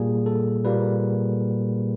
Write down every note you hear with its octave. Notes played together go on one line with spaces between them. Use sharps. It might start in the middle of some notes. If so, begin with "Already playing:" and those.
Already playing: A#2 G3 A#3 G#4
A4
A#2 G3 A#3 B4